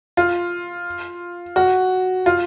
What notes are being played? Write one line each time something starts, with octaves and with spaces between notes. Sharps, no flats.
F4
F#4
F4